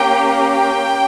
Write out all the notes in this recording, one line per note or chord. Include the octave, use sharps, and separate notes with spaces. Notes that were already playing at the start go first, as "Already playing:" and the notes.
Already playing: A#3 C#4 G4 G5
G5